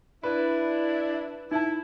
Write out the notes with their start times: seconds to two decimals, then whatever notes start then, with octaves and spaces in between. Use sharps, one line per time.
0.23 D4 E4 B4
1.51 D#4 E4 A5